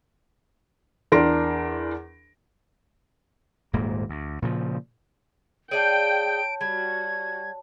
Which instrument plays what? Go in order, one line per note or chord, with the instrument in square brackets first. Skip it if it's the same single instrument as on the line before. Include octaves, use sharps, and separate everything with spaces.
[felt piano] E2 D4 A#4 C6 A#6 D7
[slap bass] D#1 G#2 A#3
D2
A#2 C#3 F3
[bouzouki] G#4 D5 F5 [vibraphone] C#5 A5 [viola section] G5 [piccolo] D7
[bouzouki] G3 [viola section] F#4 [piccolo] G#6